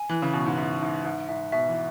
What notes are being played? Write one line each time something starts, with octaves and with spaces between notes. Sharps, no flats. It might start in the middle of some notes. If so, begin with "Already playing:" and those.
Already playing: G#5
E3 F#6
C#3
B2 C#6
G#2
G#2 E5
G#2 E5
G#2 E5
G#2 E5
B2 E5
E3